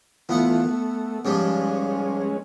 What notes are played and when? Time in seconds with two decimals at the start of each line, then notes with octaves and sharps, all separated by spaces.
0.29 E3 A3 B3 F4 F#5
0.69 A3
1.25 G#2 F3 G3 G#3 C#4